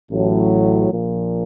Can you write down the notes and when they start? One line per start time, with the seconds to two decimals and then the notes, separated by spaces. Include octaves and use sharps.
0.11 A1 A2 F#3
0.90 A#1 A#2 F3